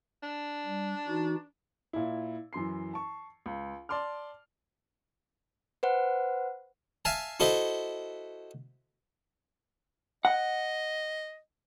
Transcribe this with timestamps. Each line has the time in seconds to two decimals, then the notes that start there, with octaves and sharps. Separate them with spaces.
0.23 D4
0.66 G3
1.08 E3 D#4 F#4
1.93 A#2 E4
2.53 F#2 E3 C6 C7
2.93 A5 C#6
3.46 C#2
3.89 D5 A5 C6 D6 F6
5.83 B4 C5 F#5
7.05 E5 F5 G#5 A5
7.40 E4 F#4 A4 C5 D#5 E5
10.25 D#5 F#5